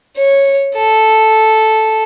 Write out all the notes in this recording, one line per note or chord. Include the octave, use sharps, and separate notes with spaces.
C#5
A4